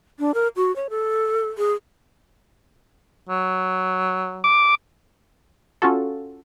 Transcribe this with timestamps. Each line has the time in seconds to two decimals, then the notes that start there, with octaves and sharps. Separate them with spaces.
0.19 D4
0.34 A#4
0.56 F#4
0.76 C#5
0.90 A4
1.58 G#4
3.29 F#3
4.44 D6
5.82 C#4 F4 F#4 A4